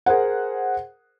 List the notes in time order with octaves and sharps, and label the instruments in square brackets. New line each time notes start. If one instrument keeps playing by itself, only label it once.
[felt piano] G#4 A#4 C5 F#5